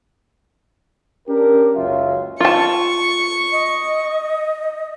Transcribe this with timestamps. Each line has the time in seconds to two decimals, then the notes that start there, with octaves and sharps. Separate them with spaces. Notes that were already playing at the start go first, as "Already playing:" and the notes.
1.28 C#4 D4 G4 A#4
1.75 F#1 C#2 F#3 F4 E5
2.40 F4 A5 C#6
3.52 D#5